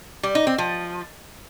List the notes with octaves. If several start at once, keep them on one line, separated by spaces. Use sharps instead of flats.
G3
D#4
C4
F3